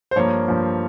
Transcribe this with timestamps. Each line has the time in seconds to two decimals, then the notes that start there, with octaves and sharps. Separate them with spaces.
0.11 C5
0.16 G2 F3 A#3 C#5
0.46 G2 F3 A#3